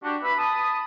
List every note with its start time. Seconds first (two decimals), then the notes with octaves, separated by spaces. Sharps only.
0.03 D4 F#4 G4
0.23 B4 E5 B5
0.38 A5 B5 D#6